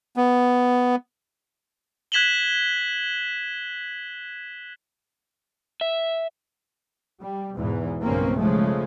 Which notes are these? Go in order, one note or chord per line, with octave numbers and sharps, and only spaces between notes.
B3
F#6 G#6 B6 E7 F#7 G7
E5
G3
E2 G#2 B2 E3
B1 G2 C#3 A#3 C4 C#4
C#3 F3 G#3 A3